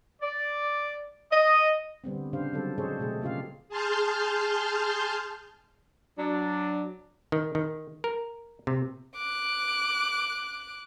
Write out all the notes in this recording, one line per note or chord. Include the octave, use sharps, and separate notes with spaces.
D5
D#5
D3 G3 B3 C4
C#3 D4 G4 C5 F5
F#3 G3 C4 A4
G#3 G#4 A4 C5 C#5 D#5
B2 G#3 A3 G#4
C#3 A#3 F4 G4 F5
G#4 A5 C6 F6 G6
F#3 D4
D#3
D#3
A#4
C3
D6 F#6